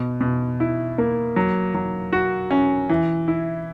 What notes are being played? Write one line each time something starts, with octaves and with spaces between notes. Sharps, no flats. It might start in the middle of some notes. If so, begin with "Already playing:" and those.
Already playing: B2
B2
E4
A#3
F#3
F#3
F#4
C#4
E3
E4